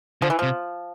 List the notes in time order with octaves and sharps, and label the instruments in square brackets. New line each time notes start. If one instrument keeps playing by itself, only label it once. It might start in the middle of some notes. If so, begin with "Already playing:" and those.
[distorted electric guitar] D3 [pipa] F3
[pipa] E3
[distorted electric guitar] C3 [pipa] F3